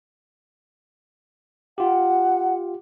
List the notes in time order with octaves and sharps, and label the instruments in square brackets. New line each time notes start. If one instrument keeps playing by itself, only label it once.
[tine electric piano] F4 G4 [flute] F#5